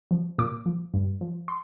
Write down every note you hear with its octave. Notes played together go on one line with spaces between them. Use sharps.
F3
A#2 D6
F3
G2
F3
C6